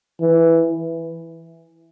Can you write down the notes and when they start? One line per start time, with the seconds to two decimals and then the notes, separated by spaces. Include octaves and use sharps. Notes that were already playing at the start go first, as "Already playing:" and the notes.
0.20 E3